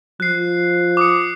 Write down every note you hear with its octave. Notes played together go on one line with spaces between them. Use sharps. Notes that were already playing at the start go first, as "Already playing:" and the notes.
F3 F#6 C7
D6 D#6 C#7